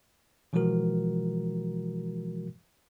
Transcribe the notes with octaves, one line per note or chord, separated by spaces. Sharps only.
B2 E3 F3 G#3 F#4 A#4